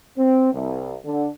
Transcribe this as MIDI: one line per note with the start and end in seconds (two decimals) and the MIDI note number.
0.18 0.53 60
0.53 0.96 36
1.05 1.28 50